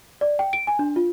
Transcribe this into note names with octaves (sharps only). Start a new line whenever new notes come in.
D5
G5
D7
G#5
D4
F4